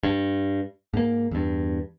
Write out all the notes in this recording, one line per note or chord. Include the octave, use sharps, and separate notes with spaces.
G2
G#2 A#3
E2 G2